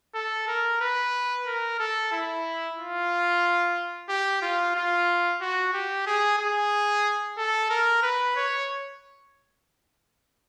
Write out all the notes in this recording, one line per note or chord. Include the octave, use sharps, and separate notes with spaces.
A4
A#4
B4
A#4
A4
E4
F4
G4
F4
F4
F#4
G4
G#4
G#4
A4
A#4
B4
C#5